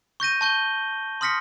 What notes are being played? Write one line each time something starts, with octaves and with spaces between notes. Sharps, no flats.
C#6 G6 A#6 D#7
A5 C#6 G6 G7
C6 D#6 F6 A#6 B6 C#7